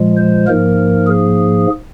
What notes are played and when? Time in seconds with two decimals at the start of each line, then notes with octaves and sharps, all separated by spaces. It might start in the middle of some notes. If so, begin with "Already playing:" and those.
Already playing: A#2 F3 G#3
0.17 C5
0.47 G#2 F3 A#3 A#4
1.07 G#4